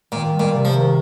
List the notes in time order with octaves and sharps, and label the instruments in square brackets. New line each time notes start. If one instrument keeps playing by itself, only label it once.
[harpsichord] A#2 [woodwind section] D#3
[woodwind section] G3
[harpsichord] A#2
[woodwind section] C3
[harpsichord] F3
[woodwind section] D#3